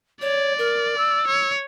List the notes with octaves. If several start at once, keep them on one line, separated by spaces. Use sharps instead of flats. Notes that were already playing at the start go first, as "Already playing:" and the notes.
C#5 D5
A#4
E6
C#5